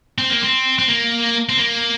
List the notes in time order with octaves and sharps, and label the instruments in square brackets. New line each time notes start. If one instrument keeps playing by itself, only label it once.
[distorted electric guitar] C4
A#3
C4
C4
A#3
C4
A#3